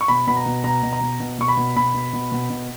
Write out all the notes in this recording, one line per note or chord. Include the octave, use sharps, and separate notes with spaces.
C#6
B2 B5
B2 B5
A#5
B2
B2 A#5
B2
A#5
B2
B2
B2 C#6
B5
B2
B2 B5
B2
B2
B2
B2